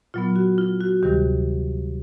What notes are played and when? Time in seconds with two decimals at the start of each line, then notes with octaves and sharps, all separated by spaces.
0.14 A#2 F#3 B3 F4
0.36 F#4
0.58 F4
0.80 F#4
1.02 D2 C3 D#3 G3 G4